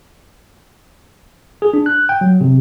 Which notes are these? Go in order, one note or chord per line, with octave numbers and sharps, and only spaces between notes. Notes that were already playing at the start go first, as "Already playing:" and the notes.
G#4
D4
F#6
G5
F#3
C3